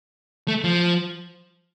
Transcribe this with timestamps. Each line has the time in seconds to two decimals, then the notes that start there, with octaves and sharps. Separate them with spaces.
0.48 A3
0.64 F3